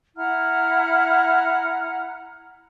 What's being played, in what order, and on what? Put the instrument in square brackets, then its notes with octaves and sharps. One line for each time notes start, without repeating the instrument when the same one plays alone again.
[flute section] E4 F#5 A#5 F6